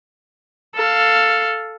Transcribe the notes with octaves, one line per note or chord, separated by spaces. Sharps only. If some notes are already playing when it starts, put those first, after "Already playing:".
A4 F5